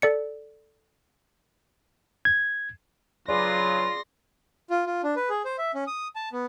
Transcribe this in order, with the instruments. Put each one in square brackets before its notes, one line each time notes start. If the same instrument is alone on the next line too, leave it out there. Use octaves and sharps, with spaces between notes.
[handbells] A4 D5 C#7
[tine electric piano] G#6
[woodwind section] C#3 F#3 B4 [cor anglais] F4 [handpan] G#4 D5 [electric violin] C6 A#6
[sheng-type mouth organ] F4
F4
D4
B4
G#4
C5
E5
C#4
D#6
A5
B3